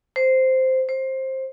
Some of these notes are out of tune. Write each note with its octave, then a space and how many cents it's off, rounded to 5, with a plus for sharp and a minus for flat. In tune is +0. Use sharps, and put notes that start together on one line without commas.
C5 -5
C5 +15